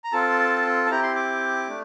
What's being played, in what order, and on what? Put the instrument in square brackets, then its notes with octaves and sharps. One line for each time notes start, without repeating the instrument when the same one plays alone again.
[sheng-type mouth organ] A#5
C4 F4 A4 A5
A5
C4 E4 G4 A#5
C6
D6
A3 D4